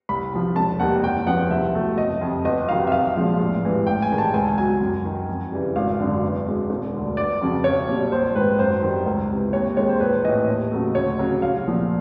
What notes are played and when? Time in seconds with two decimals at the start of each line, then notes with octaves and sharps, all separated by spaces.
0.09 C2 B5
0.32 C3 F3
0.56 E1 A5
0.80 D#2 D#3 G3 F#5
1.03 F#1 G5
1.26 E2 C#3 F3 F#5
1.51 C2 E5
1.75 B2 F#3 A3
1.98 F#1 D#5
2.21 F2 C3
2.45 G1 D#5
2.69 F2 C3 D#3 F#3 F5
2.87 E5
2.92 B1 F5
3.16 A#2 F3 G#3
3.39 A1
3.63 G#2 E3 G3
3.87 A1 G5
4.02 G#5
4.10 G2 D#3 G#3
4.18 A5
4.34 C#2 G#5
4.58 B2 F#3 G#5
4.81 F#2
5.05 D#3 F#3
5.28 F2
5.52 C#3 E3 G3
5.75 G#1 F5
6.00 F#2 D3
6.23 E2
6.46 B2 G#3
6.70 E1
6.94 D2 D3
7.17 G1 D5
7.41 F2 C#3 F#3
7.64 B1 C#5
7.88 A#2 G3
8.12 A#1 C5
8.35 G#2 D#3 B4
8.59 F#2 C5
8.82 D#3 G3
9.06 C#2
9.30 C3 E3
9.53 D#2 C#5
9.77 D#3 G#3 C#5
9.89 C5
10.00 A#1 B4
10.24 A2 E3 D#5
10.48 D#2
10.72 C#3 F#3 A3
10.95 D2 C#5
11.19 C#3 F#3
11.42 C2 F5
11.66 A#2 F3 A3